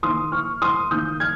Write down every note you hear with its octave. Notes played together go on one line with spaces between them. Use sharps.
D#3 A#3 C6 D#6
C#6 F6
C6 D#6
D#3 A#3 D#6 G6
F6 G#6